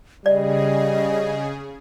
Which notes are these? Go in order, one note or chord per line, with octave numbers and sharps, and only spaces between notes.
C#3 G3 G#4 D5 D#5